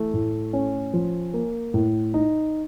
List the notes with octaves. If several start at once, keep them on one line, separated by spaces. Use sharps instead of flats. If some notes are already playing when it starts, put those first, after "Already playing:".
Already playing: E3 A3
A2
C#4
F3
A#3
A2
D#4